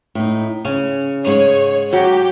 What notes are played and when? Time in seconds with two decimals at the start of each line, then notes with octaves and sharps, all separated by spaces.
0.15 A2 D#4
0.65 C#3 C#4
1.25 G#2 C#4 C#5
1.93 F#3 G4